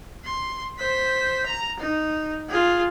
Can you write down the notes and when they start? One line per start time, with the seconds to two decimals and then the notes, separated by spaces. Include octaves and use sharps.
0.24 C6
0.78 C5 B6
1.46 A#5
1.80 D#4
2.49 F4 G#4